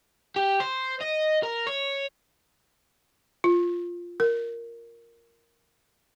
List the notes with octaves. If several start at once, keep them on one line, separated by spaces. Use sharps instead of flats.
G4
C5
D#5
A#4
C#5
F4
A#4